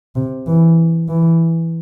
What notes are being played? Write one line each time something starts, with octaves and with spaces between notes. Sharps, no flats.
C3
E3
E3